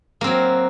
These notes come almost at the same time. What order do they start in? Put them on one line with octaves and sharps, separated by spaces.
A#3 C4 F#3